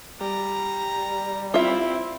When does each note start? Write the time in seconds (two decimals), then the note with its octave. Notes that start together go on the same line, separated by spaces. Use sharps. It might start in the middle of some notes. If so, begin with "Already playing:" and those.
0.21 G3 A#5
1.54 C4 E4 F4 E5